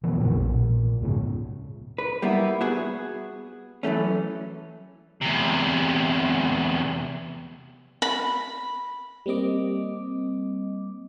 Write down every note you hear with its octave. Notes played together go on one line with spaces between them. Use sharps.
B2 E3 F3 B3
A#2 D3 F3
A#1
A#2
C#2 G#2 C#3
B4
G3 A#3 B3 E4
B3 F#4 G#4
E3 F#3 A3 C#4
E2 C3
B5
G3 A#3 C4 D#5 D6